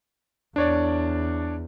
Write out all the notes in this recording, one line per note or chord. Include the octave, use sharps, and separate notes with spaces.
E2 D4 C#5 D5